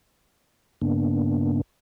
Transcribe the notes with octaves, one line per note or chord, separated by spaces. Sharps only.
G2 C#3 A#3 B3 D4